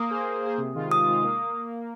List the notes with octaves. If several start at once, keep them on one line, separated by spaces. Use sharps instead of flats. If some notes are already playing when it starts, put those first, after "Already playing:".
Already playing: A#3 D#6
G#4 C5
A#3
G#4 C5
C3
D#3 G#3 F4
C3 D#6
D#3 G#3 F4
A#3